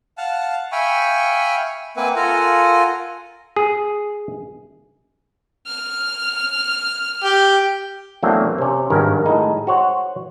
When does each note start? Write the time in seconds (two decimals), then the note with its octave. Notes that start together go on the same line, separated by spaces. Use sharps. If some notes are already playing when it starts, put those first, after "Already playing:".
0.18 F5 F#5 A5
0.72 E5 F5 G5 G#5 B5 C#6
1.97 A#3 C4 B4 E5 F#5 G#5
2.16 F4 A4 A#4 F5 F#5 G#5
3.56 G#4
5.67 F6
7.24 G4
8.23 E2 F#3 A3 A#3 C4 D4
8.58 C3 C#4
8.90 G#1 G2 D#3 C#4 A#4
9.26 A2 G#3 D#4
9.67 F#4 C5 C#5 F#5